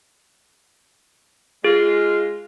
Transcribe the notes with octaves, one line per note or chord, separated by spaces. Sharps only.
G#3 F4 G#4